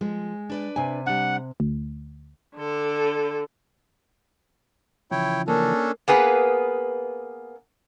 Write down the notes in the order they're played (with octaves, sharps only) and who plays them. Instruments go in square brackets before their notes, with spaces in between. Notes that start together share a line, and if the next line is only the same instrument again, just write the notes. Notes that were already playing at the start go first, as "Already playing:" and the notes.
[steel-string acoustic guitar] F3 [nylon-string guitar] G#3
[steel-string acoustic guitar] D4 B4 D5
[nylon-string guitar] C3 G#5
[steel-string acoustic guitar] G3 D4 [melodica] F#5
[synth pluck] D2
[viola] D3 A4
[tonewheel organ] C#3 E3 F3 [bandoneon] E4 C#5 G5
[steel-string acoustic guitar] A#3 [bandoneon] C#4 D4 A4
[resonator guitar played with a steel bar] A#3 B3 G#4 B4